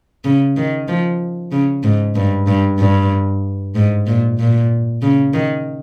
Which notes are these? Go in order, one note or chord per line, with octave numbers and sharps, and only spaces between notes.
C#3
D#3
F3
C#3
G#2
G2
G2
G2
G#2
A#2
A#2
C#3
D#3